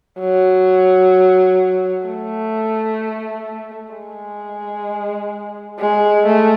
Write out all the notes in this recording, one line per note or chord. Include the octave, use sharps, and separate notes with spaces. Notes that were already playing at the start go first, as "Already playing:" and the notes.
F#3
A3
G#3
G#3
A3